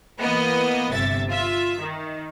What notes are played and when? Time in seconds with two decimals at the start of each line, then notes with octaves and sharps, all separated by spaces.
0.20 E3 A#3 B3 D#5
0.91 G1 C3 E5 A6
1.29 F4 E5
1.81 D#3